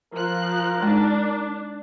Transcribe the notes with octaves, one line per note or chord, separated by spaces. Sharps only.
F3 A#4 F#6
G#3 D4 D#4